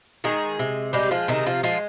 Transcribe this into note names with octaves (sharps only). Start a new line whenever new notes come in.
D#3 G#3 G#4
C3
G3 G#3 G4
F3 F4
C3 D#3 D#4
F3 F4
F3 G#3 F4